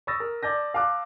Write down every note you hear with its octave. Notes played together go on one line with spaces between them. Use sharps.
B5 C#6 D#6 E6 A6 A#6
A#4
D5 A5 G6 A#6
F5 A5 D6 F#6